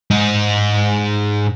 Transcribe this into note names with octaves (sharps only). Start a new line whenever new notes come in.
G#2 D#4